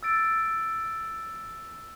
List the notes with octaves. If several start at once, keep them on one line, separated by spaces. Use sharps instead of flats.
E6 A6 D7